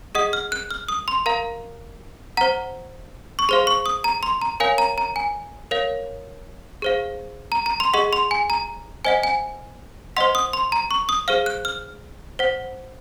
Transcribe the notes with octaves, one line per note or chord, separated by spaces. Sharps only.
G#4 D#5 F#5 D#6
F6
F#6
F6
D#6
C6
A#4 F5 A#5
C5 F#5 A#5
C#6
G#4 C5 F5 C6
C#6
D#6
A#5
C6
A#5
A#4 C#5 F5 G#5
A#5
A#5
G#5
A#4 C#5 F5
G#4 C5 F5
A#5
A#5
C6
G#4 D#5 F#5 C#6
C6
G#5
A#5
C5 D#5 F#5 G#5
G#5
C5 D#5 F#5 C6
D#6
C6
A#5
C#6
D#6
G#4 C5 F5 F6
F#6
F6
C5 F#5